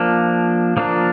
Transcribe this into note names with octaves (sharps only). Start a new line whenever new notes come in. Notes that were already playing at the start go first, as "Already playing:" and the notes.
Already playing: F3 A#3 D4
F3 A#3 D4